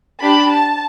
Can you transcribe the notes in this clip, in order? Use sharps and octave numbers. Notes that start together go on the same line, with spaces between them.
D4 G4 B5
A5